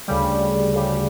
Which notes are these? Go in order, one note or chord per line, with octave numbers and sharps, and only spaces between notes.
D2 C#3 G3
D2 C#3 G3